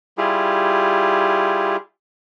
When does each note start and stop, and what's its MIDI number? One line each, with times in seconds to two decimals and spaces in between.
0.18 1.76 55
0.18 1.76 64
0.18 1.76 65
0.18 1.76 67
0.18 1.76 68